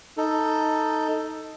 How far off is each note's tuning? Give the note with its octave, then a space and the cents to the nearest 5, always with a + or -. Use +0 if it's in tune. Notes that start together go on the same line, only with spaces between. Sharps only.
D#4 +10 A4 +10